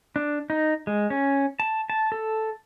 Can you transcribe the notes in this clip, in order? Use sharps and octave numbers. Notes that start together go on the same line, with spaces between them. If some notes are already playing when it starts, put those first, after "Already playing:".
D4
D#4
G#3
C#4
A5
A5
A4